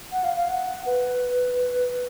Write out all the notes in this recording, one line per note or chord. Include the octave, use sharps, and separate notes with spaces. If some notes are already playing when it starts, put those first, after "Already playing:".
F#5
F5
F5
F#5
B4